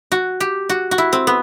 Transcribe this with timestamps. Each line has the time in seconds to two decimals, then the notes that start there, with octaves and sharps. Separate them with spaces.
0.12 F#4
0.40 G4
0.69 F#4
0.91 F#4
0.98 E4
1.13 C4
1.27 B3